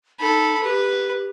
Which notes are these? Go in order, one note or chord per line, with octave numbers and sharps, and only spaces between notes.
D#4 A4 B5
G4 B4